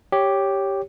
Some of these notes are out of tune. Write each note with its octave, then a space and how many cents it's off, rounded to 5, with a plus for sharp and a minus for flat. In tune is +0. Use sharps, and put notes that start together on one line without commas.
G4 +0 C#5 +0